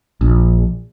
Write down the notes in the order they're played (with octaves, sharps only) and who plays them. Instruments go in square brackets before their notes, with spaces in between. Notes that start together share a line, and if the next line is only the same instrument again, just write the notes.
[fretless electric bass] A#1